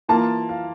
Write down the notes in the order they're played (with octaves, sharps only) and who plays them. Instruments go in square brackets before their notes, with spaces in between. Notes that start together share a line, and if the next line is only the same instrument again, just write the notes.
[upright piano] E3 A#3 F4 A5
F5